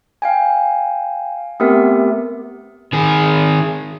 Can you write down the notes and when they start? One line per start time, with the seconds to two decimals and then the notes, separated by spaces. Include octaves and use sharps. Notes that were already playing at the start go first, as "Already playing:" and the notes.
0.22 F5 G5 G#5
1.60 A3 B3 C4 G4 A#4 E5
2.93 D#3 G#4